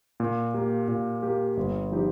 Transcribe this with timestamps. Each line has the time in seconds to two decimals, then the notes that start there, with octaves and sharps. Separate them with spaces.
0.20 A#2
0.54 A#3 G4
0.88 A#2
1.23 A#3 G4
1.57 G1
1.92 F3 D#4 G4